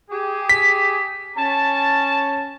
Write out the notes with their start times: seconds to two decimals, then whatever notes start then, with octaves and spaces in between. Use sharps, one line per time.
0.11 G4 G#4
0.49 B6
1.36 C#4 A5